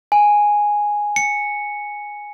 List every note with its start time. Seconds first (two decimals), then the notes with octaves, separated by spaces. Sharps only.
0.12 G#5
1.16 C#7